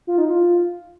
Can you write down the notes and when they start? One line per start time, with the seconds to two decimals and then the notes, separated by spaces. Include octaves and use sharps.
0.07 F4
0.18 D#4
0.29 F4